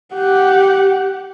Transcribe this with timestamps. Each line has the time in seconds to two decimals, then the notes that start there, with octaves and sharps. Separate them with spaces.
0.14 G4 F#5